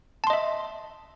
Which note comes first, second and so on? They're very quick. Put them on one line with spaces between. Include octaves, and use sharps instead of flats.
A5 C6 D#5 E5